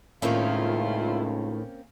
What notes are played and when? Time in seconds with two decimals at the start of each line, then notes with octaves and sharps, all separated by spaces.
0.22 C#2 A2 D#3 A#3 C4 C#4 E4 F4